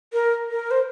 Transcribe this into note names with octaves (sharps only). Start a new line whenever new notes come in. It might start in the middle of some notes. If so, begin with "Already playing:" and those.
A#4
A#4
C5